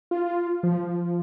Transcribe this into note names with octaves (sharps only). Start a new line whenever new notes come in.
F4
F3